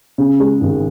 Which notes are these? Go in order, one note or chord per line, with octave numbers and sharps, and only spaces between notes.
C#3
G#3
G#1